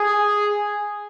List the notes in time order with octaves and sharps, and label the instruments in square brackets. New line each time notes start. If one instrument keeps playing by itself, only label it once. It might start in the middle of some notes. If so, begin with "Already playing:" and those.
Already playing: [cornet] G#4